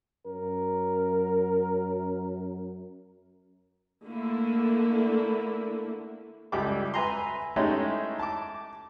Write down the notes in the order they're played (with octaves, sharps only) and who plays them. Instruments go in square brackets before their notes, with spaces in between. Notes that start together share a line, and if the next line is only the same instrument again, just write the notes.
[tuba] F#2 [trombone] A#4
[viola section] D3 A3 A#3 E4
[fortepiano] C#2 G3 G4 A4 E5 D6
B4 E5 G#5 A#5 C6
G#3 A3 C#4 D#4 E4 G4
A5 D6